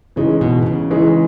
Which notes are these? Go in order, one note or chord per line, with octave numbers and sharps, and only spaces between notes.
C#3 E3 G#3 D#4
B2
B2
C#3
E3 G#3 D#4